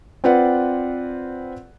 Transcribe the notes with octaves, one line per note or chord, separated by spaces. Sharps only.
C4 F4 B4 D5 F#5